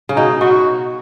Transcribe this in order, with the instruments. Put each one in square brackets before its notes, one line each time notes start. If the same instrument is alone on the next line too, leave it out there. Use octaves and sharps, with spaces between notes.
[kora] C#3
[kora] B2 [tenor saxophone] D#4
[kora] B2 [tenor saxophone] F#4